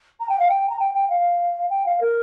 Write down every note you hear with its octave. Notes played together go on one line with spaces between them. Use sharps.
A#5
G5
F5
G5
A#5
G5
G5
F5
G5
F5
A#4